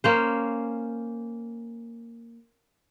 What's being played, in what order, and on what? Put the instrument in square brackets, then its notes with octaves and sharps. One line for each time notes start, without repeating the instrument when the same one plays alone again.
[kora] A#3 C#4 C5